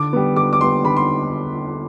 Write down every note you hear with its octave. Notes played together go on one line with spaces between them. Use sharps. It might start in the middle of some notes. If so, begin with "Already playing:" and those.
Already playing: D3 D6
G3 B3
D3 D6
D6
G3 B3 C6
D3 B5
C6